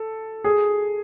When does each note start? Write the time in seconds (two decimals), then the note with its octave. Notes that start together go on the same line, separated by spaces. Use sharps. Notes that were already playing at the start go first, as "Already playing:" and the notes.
Already playing: A4
0.44 G#4